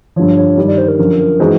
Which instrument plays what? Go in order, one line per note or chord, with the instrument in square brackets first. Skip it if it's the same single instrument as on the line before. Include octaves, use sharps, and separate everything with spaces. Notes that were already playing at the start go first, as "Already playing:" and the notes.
[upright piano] G2 D3 F3 [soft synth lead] C#5
[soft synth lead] C#5
[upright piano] G2 D#3 G3
[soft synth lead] D5
C5
A#4
[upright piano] F#2 D3 F3 [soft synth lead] A#4
[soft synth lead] A#4
[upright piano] E3 G#3 C4 D#4 F#4 [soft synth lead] C5